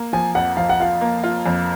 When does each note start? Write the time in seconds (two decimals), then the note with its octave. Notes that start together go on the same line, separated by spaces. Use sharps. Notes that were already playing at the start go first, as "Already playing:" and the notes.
Already playing: A#3
0.13 F3 G#5
0.35 F2 F#5
0.57 F3 F5
0.70 F#5
0.80 F4 F5
1.01 A#3
1.24 F4
1.46 F2